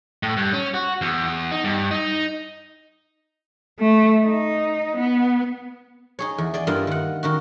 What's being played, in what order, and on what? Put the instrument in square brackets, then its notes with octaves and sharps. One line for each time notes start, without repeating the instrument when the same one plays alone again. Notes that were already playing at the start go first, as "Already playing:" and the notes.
[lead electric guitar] A2
G2
C#4
F#4
E2
D#4
G2
D#4
[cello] A3
D#4
B3
[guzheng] D#4 G#4 C#5
E2
G#4 D5 D#5
G2 A#3 E4 F4 D#5
D#3 F#5
D#3 D#4 F#4